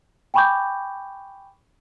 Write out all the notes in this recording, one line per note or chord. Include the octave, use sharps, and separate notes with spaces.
G5 G#5 B5 C#6 D6 G6